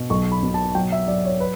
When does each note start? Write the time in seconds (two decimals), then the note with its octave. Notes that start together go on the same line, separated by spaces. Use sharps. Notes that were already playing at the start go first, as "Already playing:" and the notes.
Already playing: B2
0.10 B1 C#6
0.32 B5
0.43 B2
0.54 A5
0.75 F#3 G5
0.92 E5
1.08 F#3 D5
1.25 C#5
1.40 B4